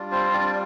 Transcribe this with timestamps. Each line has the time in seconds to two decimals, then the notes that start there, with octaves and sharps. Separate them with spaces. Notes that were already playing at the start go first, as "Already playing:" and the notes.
Already playing: G3 D4 F4
0.12 C4 C5
0.33 D4 D5